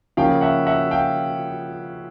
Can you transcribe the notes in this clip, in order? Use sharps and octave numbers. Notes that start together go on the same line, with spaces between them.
C#3 F3 A#3 C#4 F5 G5
E5 F#5
E5 F#5
F5 G5